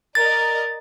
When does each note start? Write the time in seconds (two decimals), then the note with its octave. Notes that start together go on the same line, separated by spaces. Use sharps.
0.15 A#4 D5 D#5 A6